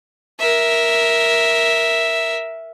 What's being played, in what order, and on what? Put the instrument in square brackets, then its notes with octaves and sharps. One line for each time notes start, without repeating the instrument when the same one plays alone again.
[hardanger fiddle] A#4 E5